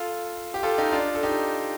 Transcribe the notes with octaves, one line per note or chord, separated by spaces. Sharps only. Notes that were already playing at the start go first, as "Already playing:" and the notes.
Already playing: F4 A4
G4
F4 A4
D#4 G4
D4 F4
A4
D#4 G4